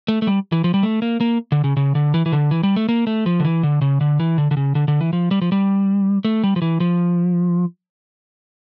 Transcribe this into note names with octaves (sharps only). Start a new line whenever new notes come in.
A3
A3
G3
E3
F3
G3
A3
A#3
A#3
D3
C#3
C#3
D3
E3
E3
D3
E3
G3
A3
A#3
A3
F3
D3
E3
D3
C#3
D3
E3
D3
D3
C#3
D3
D3
E3
F3
G3
F3
G3
A3
G3
F3
E3
F3